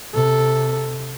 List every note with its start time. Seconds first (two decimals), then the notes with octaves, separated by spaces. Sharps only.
0.14 C3 A4